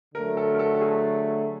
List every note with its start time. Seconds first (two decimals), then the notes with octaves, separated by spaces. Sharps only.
0.15 D3 F#3 A3 A#4
0.37 A4
0.54 A#4
0.59 A4
0.74 A4
0.81 G#4